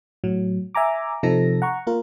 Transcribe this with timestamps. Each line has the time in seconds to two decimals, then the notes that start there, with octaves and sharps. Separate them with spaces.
0.24 A2 F#3
0.75 E5 G#5 A#5 D6
1.23 C3 F3 D#4 A4 A#6
1.62 F#5 A#5 C#6
1.87 A#3 F4 A#4